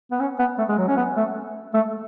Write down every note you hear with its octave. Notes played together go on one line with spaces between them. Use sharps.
B3
C#4
B3
A3
G#3
F#3
C#4
B3
A3
A3